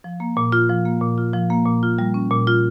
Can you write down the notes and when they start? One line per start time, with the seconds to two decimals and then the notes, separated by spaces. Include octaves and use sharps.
0.04 F3
0.20 A#3
0.37 A#2
0.52 F4
0.70 F3
0.85 A#3
1.01 A#2
1.18 F4
1.33 F3
1.50 A#3
1.66 A#2
1.83 F4
1.98 G3
2.14 C#4
2.31 A#2
2.47 F4